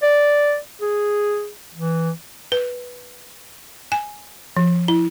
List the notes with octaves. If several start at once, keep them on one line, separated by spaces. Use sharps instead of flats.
D5
G#4
E3
B4
G#5
F3
E4